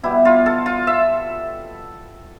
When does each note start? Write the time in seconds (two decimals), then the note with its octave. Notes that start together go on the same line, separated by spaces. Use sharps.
0.03 B2 G3 B3 E4
0.25 F4
0.46 A4
0.66 F4
0.87 E5